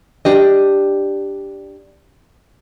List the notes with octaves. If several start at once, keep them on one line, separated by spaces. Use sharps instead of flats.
D4 G4 D#5